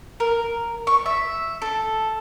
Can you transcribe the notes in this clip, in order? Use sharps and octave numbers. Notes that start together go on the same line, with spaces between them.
A#4
C#6
E5
A4